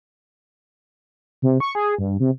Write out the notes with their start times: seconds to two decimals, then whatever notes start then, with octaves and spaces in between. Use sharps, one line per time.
1.42 C3
1.60 C#6
1.75 G#4
1.99 G2
2.20 C3